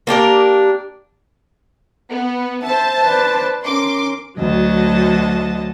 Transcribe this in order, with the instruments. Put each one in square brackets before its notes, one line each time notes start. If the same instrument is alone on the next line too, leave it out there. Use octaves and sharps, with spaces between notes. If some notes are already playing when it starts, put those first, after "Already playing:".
[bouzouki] A#3 D4 G4 A#4
[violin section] B3
[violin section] C5 A5 [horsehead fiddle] E5
[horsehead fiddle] B4 D5
[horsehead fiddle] C#4 A#4 [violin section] C6 D6
[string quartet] D2 F#3 F#4 D#5 A5